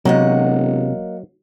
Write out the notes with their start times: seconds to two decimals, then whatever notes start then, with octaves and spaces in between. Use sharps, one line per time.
0.05 E1 C3 F#3 A#3 D#5 F#5